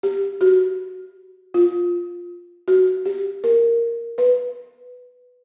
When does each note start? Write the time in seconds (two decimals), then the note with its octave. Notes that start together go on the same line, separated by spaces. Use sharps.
0.03 G4
0.41 F#4
1.54 F4
2.68 F#4
3.06 G4
3.44 A#4
4.18 B4